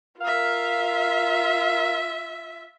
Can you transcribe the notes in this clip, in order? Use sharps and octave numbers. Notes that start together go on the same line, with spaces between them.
F4 A#4 E5 F5